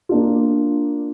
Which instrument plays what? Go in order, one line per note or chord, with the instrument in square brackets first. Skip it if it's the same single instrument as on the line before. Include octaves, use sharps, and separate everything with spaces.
[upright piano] A#3 D4 F4